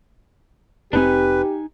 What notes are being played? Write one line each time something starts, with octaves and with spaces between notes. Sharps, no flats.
F1 C4 D4 D#4 G4 B4 G#5